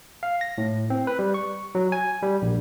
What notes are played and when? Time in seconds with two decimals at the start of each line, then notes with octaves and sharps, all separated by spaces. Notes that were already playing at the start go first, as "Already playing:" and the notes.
0.23 F5
0.41 A#6
0.58 A2
0.90 C4
1.07 B4
1.19 G3
1.34 C#6
1.75 F#3
1.92 G#5
2.23 G3
2.42 A#1